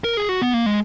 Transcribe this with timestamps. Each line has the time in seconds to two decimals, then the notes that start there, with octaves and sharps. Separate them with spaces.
0.04 A#4
0.17 G#4
0.29 F#4
0.42 B3
0.54 A#3
0.66 G#3